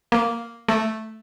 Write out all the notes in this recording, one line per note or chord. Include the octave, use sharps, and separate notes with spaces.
A#3
A3